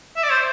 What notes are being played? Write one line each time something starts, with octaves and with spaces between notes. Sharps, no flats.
E5
D5
C5